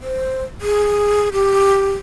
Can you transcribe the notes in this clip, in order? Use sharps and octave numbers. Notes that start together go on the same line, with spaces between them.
C5
G#4
G4